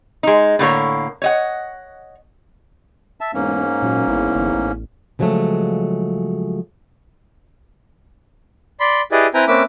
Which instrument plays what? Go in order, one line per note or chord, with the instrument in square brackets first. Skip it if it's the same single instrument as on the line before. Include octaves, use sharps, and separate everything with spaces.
[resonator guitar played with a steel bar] G#3 D#4
A2 D3 A#3 C#5
C#5 D#5 F#5
[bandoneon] E5 A5
[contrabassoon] E1 [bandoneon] G#2 A#3 C#4
[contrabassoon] F#2 [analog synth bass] A#2
[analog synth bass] G#1 [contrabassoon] E2
[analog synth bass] G1
A1
[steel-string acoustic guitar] C#3 F3 F#3 G#3 A3
[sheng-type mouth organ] D5 B5 C6
E4 G4 G#4 B4 D5 D#5
C4 E4 B4 G5 G#5 A#5
A#3 C4 C#4 B4 E5 D6